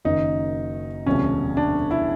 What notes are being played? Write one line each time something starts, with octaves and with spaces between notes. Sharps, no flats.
F#1 F#2 D#3 D#4
E1 D2 C3 F3 C#4
D4
E4